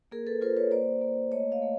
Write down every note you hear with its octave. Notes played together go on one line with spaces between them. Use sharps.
A#3 G#4 A#4
A4 B4
F4 A#4 C5
B4 C#5
A#3 C5 D5
A#3
A3 C#5 D#5
D#5 F5
A3